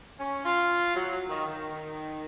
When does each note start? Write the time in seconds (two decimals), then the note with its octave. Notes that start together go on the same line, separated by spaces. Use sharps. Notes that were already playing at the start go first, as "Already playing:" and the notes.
0.19 C#4
0.45 F4
0.95 F#3
1.29 D#3
1.46 D#3